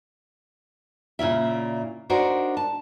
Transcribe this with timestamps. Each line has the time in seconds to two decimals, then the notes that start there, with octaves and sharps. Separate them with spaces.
1.19 A#2 C#3 E4 E5
2.10 D4 D#4 F#4 A#4 C5
2.57 A5